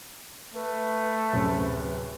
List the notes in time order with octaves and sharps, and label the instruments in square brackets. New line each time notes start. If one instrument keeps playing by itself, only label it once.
[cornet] A3 [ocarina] B4
[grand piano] D1 F#2 C3